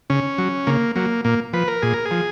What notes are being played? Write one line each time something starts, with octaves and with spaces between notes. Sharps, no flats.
C#3 C#4
F#3
C#3 A#3
F#3 A#3
A#2 A#3
F3 B4
A#4
A#2 G#4
A#4
G#4
F3